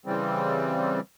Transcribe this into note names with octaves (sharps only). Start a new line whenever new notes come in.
C#3 E3 G3 C4